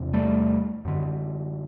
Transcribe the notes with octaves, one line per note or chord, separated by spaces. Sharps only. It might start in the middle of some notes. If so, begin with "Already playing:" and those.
Already playing: E2 C3
G3 A3
F#2 D3